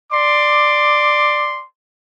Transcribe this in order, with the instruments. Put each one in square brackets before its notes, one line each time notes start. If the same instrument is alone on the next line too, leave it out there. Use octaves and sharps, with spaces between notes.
[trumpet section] D5 C6 D6